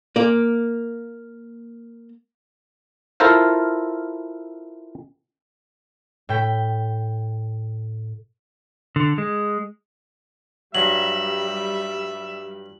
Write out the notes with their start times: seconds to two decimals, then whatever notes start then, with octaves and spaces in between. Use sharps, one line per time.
0.16 A#3 D5
3.20 E4 F4 A4 A#4 C5 F5
6.29 A2 G5 B6
8.96 D3
9.18 G#3
10.75 G2 F#3 G3 E5 F#7